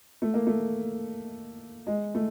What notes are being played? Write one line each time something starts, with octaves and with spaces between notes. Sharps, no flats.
A3
A#3
A3
G#3
A3